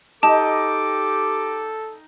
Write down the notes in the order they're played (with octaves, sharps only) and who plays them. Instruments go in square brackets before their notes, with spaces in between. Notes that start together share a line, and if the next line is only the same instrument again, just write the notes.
[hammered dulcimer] D#4 G5 [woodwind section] G4 D6 [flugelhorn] A4 [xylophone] A5